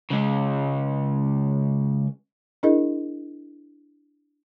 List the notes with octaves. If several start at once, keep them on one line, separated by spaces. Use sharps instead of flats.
C#3 G#3
D4 E4 G#4 A#4 D#5